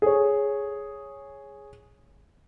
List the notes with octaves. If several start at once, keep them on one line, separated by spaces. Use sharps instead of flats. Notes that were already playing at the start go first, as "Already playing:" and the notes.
G#4 C#5